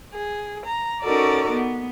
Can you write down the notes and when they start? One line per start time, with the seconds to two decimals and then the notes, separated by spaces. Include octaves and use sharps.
0.13 G#4
0.65 A#5
1.02 C#4 D#4 F#4 A4 A#4 D5
1.51 B3